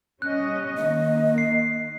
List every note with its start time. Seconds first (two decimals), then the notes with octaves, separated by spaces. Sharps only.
0.22 G3 C#4 D#5 F#6
0.77 D#3 A#3 D#5
1.38 C7